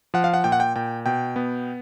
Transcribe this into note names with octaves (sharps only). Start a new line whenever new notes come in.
F3 F#5
F5
F#5
A#2 G5
F#5
G5
A#2 G5
B2 G5
B3